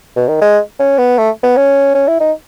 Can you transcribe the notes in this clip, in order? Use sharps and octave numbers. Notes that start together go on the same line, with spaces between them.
B2
D#3
G#3
C#4
B3
A3
B3
C#4
C#4
E4
D#4